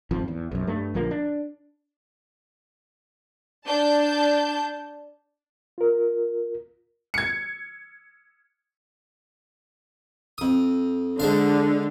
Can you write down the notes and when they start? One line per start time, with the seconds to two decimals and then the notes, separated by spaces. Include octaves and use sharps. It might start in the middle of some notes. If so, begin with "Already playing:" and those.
0.11 G#1 F2 F3
0.28 E2
0.51 B1 F#2
0.67 G2 A3
0.94 A#1 D3 F3 A#3
1.11 D4
3.66 D4 A5 G6
5.78 F4 A#4
7.14 G#6 C#7
10.38 F2 D#6
11.20 D3 G#3 C5 F5